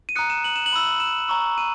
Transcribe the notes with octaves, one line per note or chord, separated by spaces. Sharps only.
D#7
A#5 D#6 F#6 C#7
E7
F#7
E7
F#7
B5 E6
E7
A#5 C#6 E6
D#7